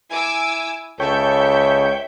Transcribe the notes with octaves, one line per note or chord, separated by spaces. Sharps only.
E4 G#5 D6 E6
C#2 A4 C#5 E5 G5 G6